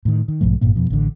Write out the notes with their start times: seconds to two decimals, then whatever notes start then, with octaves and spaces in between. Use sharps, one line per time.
0.05 A2 D#3
0.28 D#3
0.41 B1 G#2 F3 A3
0.61 G#1 G2 A#2 A#3
0.75 F2 B2 F3
0.90 A1 D3